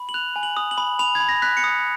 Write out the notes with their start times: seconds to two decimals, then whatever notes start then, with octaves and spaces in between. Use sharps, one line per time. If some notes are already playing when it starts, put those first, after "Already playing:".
Already playing: B5
0.09 F#7
0.14 F#6 F7
0.36 G#5
0.43 F#7
0.57 D#6
0.71 F#7
0.78 B5
0.99 B5 F7
1.15 G#6
1.20 B5
1.29 A#6
1.42 F#6 B6
1.57 C#7
1.64 D#6